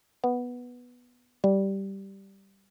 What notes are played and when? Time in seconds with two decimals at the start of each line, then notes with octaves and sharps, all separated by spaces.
0.24 B3
1.44 G3